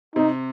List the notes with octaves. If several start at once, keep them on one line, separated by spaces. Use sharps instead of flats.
C3 D#4